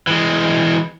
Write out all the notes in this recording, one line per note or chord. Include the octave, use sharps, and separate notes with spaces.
E3 G#3